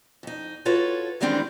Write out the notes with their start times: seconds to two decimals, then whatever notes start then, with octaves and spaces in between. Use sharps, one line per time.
0.23 F2 D#4
0.65 F4 F#4 A4 B4 C#5
1.20 D#3 E3 G3 G#3 C4 D4